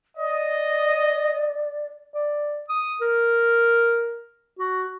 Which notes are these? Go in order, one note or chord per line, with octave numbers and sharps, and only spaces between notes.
D5 D#5
D5
D#6
A#4
F#4